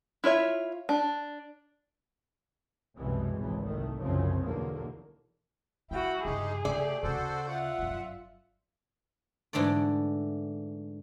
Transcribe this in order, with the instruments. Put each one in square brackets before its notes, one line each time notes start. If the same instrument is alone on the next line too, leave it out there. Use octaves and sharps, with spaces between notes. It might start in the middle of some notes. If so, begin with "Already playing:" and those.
[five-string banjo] E4 F4 C#5 E5
D4
[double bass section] C2 F#2 B2 E3 G3 G#3
G#1 C#2 E3
C2 D#3 A3
C2 F#2 C#3 F3 C4 C#4
B1 E2 D3 A#3
[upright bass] G3 [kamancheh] E4 F#4 [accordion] G5
[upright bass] G2 C#3 [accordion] G#3 D#4 G4 [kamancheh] G#4
[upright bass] C#3 A#3 [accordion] A3 G4 [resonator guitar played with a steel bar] D5
[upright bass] D2 C#3 [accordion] F#4 A4 C5
[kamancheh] F4 E5 [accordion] F#5
[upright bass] G1 F#2
[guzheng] G#2 D3 E3 A3 D5